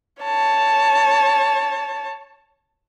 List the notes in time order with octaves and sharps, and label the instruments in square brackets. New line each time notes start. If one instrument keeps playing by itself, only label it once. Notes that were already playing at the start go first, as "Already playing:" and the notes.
[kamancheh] C#5 A5